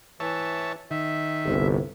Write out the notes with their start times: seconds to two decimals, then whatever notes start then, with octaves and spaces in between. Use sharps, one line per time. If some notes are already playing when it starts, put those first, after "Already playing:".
0.20 E3 C#5 E5 A5
0.91 D#3 E5
1.44 G1 C2